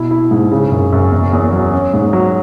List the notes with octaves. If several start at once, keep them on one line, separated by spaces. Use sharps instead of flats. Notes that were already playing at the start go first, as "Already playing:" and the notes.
Already playing: B2 E4
E4
G#2
C#3
F#2
F#2
E2
E2
F#3
C#4
G#2
F#3